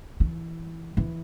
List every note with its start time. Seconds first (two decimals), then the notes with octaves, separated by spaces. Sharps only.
0.20 E3
0.97 E3